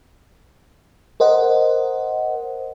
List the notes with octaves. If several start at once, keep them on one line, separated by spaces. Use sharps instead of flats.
A#4 C5 D#5 F#5